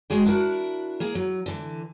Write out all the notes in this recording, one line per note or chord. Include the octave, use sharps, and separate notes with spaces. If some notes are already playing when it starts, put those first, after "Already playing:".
G#3 F#4 G#4 G5
D4 E4 F#4 A#4
A#3 G#4 A#4
F#3
D3 E3